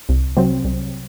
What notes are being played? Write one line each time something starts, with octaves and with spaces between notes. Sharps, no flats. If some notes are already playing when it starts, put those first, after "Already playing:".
C2
C3 F#3 C4
C2